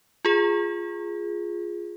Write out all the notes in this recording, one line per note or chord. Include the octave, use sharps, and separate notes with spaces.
F4 G#4